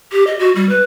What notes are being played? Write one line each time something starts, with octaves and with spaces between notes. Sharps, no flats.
G4
D#5
F#4
G3
B4